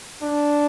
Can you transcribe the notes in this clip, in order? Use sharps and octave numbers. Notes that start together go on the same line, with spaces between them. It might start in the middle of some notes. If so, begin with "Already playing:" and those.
D4